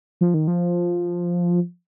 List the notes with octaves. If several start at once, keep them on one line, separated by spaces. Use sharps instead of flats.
F3
D#3
F3